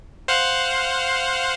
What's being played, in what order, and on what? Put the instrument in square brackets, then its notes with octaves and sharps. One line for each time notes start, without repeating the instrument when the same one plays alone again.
[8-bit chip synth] C5 F5 F#5